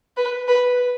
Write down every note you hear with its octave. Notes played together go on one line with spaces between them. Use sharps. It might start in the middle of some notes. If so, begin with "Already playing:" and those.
B4
B4